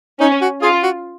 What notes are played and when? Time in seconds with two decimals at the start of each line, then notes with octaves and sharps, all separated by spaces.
0.21 C#4 D#4
0.42 F#4
0.62 F4 G#4
0.83 F#4